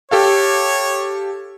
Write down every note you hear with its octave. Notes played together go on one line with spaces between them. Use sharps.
G4 A4 C#5 F5